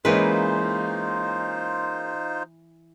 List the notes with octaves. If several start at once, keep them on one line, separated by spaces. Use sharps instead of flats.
E3 G#3 A#3 C#4 D#4 F4 B4 C5